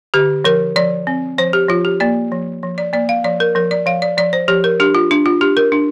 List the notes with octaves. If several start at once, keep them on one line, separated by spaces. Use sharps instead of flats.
D3 G4
F3 A#4
F3 D5
C4
F3 C5
G4
F3 F4
G4
A#3 D5
F3
F3
D5
A#3 D5
F5
F3 D5
A#4
F3 A#4
D5
F3 F5
D5
F3 D5
C5
F3 G4
A#4
D4 G4
F4
D4
F4
D4 G4
A#4
D4